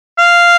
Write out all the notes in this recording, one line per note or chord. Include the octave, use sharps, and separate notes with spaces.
F5